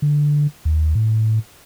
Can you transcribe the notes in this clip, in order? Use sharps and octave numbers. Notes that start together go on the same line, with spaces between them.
D3
D#2
A2